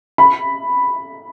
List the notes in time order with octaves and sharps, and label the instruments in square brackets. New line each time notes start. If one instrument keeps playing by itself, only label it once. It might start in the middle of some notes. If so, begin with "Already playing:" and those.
[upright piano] B5